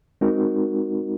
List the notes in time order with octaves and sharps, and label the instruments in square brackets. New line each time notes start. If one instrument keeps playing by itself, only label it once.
[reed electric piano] G#3 C4 D#4 F#4 A#4